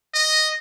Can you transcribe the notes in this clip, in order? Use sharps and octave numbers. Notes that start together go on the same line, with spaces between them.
D#5